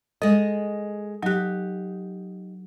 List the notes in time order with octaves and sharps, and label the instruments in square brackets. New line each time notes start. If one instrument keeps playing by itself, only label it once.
[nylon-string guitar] G#3 D#5 [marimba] A4
[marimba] F#3 F#6 [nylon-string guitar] D#4 G4